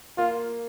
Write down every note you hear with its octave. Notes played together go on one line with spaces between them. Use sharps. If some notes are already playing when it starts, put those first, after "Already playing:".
A#3 F4